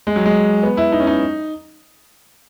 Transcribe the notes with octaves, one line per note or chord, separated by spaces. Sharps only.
G#3
F#3
G#3
B3
E4
D#4
C#4
D#4